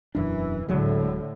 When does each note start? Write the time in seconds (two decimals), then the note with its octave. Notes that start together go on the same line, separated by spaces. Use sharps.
0.15 E1 F#2 E3 D4
0.68 D1 A2 D3 F#3 G#3